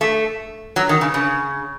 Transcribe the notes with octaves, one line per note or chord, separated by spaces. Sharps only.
A3
F#3
D#3
C#3
C#3